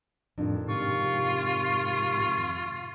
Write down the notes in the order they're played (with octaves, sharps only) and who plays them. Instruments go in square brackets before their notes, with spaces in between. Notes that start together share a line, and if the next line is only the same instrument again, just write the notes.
[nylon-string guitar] F2 D#3 [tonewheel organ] A2 [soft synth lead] D4
[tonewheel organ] G#2 C3 G4 [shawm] F4 [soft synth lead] C#6